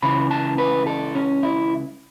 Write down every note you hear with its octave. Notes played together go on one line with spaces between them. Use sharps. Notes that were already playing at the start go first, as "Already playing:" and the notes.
C#2 C#3 E3 B5
A5
B4
A4
C#4
E4